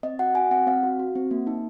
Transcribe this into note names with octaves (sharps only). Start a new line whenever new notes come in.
C4 D#5
F#4 F#5
F#4 G#5
C4 F#5
C4 F5
F#4
F#4
C4
A#3
D#4